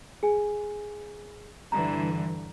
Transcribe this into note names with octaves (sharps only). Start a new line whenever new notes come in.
G#4 G#5
G2 D3 E3 A#5